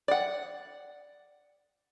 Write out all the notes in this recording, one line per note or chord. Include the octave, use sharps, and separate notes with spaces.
D5 F#5